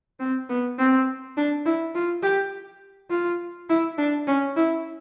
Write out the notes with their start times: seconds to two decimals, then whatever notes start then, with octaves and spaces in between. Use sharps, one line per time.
0.20 C4
0.49 B3
0.78 C4
1.37 D4
1.66 E4
1.95 F4
2.23 G4
3.10 F4
3.69 E4
3.98 D4
4.27 C#4
4.56 E4